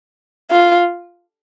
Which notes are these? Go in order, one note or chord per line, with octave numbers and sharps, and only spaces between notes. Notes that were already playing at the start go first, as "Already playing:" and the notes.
F4